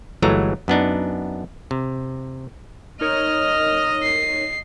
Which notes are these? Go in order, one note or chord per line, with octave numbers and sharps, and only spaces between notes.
G1 E3 F#3 G#3 A3 A#5
F#2 B3 D4 D#4
C3
D#4 A#4 C#5 D#5 F6
C7